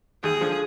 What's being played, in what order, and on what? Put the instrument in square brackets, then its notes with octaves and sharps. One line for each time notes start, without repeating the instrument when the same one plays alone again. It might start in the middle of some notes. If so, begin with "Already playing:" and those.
[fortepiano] D#2 [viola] G#4
[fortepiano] D3 F3